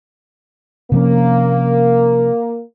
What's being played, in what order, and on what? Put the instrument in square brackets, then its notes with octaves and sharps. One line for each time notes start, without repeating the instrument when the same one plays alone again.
[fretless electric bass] C3 F3 C#4 [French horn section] A#3